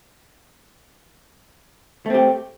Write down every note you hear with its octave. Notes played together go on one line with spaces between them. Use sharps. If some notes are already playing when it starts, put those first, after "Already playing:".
A3 C4 G4